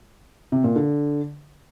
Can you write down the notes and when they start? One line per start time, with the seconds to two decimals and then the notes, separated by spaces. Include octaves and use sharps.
0.52 C3
0.64 A#2
0.76 D3